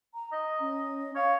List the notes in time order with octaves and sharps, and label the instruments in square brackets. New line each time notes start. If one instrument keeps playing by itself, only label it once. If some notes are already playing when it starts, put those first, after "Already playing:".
[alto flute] A#5
[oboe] D#5
[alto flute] C#4
[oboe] C#5 [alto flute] F5